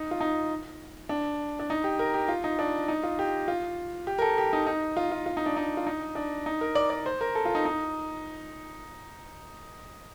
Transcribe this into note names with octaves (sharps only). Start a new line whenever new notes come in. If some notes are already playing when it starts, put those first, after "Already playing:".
Already playing: D#4
F4
D#4
D4
D4
D#4
G4
A#4
G4
F4
D#4
D4
D#4
F4
G4
F4
G4
A#4
A4
G4
D#4
D#4
F4
F4
F4
D#4
D4
D#4
F4
D#4
D4
D#4
A#4
D5
D5
C5
A#4
A4
F4
D#4
D#4